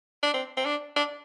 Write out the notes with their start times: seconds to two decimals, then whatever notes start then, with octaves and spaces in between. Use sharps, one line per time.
0.23 D4
0.34 C4
0.57 C4
0.66 D4
0.97 D4